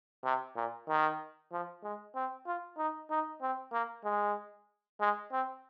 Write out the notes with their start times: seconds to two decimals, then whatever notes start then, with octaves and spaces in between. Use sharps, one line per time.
0.24 C3
0.56 A#2
0.88 D#3
1.52 F3
1.84 G#3
2.15 C4
2.46 F4
2.78 D#4
3.10 D#4
3.42 C4
3.73 A#3
4.04 G#3
5.00 G#3
5.32 C4